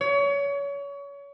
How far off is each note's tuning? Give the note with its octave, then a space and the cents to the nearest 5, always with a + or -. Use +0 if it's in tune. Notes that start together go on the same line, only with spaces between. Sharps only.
C#5 +30